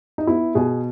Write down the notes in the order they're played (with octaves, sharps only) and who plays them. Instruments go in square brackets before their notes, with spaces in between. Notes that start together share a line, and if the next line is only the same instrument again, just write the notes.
[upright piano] D#4
B3 E4
B2 G#4